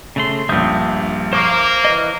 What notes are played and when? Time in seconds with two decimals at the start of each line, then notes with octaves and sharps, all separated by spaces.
0.16 C#3 A3 C6
0.49 A#1 G2 E5 D#6 G6
1.33 A#3 C5 C#6 D6
1.85 E3 B4 D#5